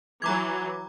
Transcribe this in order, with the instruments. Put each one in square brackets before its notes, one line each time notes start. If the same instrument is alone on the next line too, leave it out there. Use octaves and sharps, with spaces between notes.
[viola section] E3 F#3 [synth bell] A#5 D6 G#6